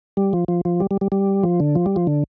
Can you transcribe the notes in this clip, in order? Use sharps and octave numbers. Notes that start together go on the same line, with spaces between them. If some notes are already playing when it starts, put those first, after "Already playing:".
G3
F3
F3
F3
G3
G3
G3
G3
F3
D3
F3
G3
F3
D3